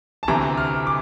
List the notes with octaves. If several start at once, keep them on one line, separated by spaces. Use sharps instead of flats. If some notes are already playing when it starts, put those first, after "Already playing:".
A5
D2 C3 E3 A#5
F6
D6